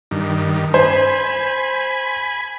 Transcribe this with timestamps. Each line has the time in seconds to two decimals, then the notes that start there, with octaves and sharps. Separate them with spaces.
0.11 G2 D#3
0.74 C5 G#5 B5